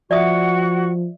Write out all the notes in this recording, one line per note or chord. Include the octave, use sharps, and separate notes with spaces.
F3 F#4 D5 E5 F#5 C#6 D#6